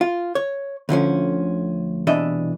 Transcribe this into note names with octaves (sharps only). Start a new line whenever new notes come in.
F4
C#5
D2 D3 F3 C#4
C2 B2 E3 D4 D#5 E5